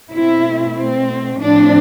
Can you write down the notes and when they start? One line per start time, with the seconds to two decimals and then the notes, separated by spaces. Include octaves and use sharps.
0.10 B2 A3 C4 E4
0.75 C4
1.40 A2 F3 C4 D4